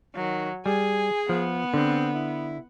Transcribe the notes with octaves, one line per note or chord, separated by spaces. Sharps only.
D#3 F#3
G3 G#4 G#5
F3 B3
D3 C4
E4